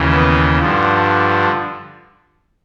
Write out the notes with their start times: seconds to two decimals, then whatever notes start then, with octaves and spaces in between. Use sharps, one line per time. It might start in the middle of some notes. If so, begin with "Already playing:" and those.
Already playing: D#2 C#3 E3
0.13 B3
0.59 G2 D3 F3